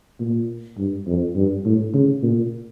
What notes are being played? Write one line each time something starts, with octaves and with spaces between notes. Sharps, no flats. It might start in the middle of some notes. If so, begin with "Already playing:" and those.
A#2
G2
F2
G2
A2
C#3
A#2